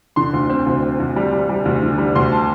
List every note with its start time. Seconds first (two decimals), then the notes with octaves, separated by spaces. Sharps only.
0.16 D3 C6
0.33 D2
0.50 C4
0.66 D2
0.83 C4
1.00 D2
1.16 G3
1.33 G3
1.49 G3
1.65 D2
1.83 D3
1.98 G3
2.15 D2 C6
2.32 A5